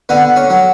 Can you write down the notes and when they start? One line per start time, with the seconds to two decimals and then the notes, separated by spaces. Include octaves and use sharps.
0.09 D3 B3
0.36 C#4
0.50 F#3